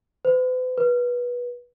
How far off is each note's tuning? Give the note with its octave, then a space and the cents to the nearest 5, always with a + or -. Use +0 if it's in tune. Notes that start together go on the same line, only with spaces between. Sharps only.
B4 +45
B4 -20